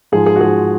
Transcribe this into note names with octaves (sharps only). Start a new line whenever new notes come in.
G#2 F3 G#4
G#4
F#4
G#2 F3 G#4